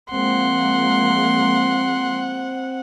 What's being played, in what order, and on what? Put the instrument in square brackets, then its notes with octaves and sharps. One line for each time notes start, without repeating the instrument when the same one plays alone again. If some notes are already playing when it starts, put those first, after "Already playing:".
[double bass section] F3 G#3 A#3 [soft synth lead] C4 [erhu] F#5 [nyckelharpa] C6